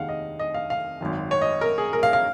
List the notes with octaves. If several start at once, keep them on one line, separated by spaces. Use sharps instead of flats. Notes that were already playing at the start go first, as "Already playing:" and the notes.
Already playing: F1 D#2 D#3 G#3 F5 F#5
D#5
D#5
F5
F5
G#1 F#2 D#3
C#5
D#5
A#4
G#4
A#4
F5
F5